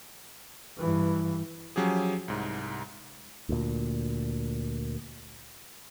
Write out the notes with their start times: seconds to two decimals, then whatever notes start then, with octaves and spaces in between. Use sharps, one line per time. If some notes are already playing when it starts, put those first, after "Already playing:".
0.77 G2 E3
1.76 F3 F#3 C#4 G4 G#4
2.28 C2 G#2
3.49 D2 A#2